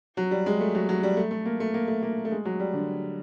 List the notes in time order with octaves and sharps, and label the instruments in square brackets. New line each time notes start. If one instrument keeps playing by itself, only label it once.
[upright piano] F#3
G3
G#3
A3
F#3
F#3
G3
A3
A3
A#3
A3
A#3
A3
A#3
A3
G#3
F#3
G3
D3